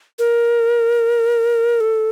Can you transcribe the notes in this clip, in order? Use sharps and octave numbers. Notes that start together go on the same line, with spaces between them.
A#4
A4